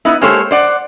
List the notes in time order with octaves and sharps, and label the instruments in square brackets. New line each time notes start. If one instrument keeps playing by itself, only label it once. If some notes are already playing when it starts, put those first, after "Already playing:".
[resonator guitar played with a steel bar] B3 D#4 E4
G#3 A#3 G4 A4 C5 C#5
C5 D5 F#5